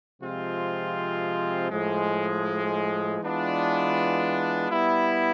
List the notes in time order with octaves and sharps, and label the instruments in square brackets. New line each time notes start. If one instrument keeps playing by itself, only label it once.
[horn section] C3 F3 G#3 C4 F4
A2 F3 G#3
E3 G#3 B3 D4 F4
G3 B3 E4